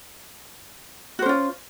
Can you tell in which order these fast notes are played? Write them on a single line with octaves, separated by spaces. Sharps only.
F#4 C5 C#4 F4